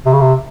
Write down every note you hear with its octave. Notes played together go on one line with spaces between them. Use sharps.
C3
C#3
C3